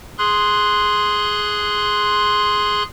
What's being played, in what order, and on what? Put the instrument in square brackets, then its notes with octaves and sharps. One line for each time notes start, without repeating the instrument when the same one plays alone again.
[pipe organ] G#4 C6 F#6